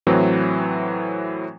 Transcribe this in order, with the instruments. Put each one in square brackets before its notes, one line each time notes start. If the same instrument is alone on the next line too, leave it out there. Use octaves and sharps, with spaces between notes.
[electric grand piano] A2 E3 F#3 C4